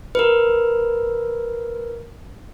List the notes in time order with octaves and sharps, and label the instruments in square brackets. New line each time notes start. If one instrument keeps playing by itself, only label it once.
[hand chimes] A#4 B4